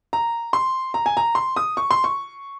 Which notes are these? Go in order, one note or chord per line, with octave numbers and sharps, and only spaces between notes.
A#5
C6
A#5
G#5
A#5
C6
D#6
C#6
C6
C#6